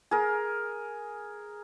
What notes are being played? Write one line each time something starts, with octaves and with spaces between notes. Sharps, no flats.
G#4 A#4